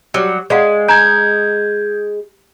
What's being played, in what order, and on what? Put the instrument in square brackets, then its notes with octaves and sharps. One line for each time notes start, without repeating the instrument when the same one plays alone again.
[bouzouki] F#3 G3
[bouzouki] G#3 [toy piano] D5 F5 F#5
[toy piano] G#5 A#5 [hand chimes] G6 G#6